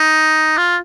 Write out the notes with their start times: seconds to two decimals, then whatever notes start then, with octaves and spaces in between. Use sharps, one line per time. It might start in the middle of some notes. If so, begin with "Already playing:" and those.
Already playing: D#4
0.58 F4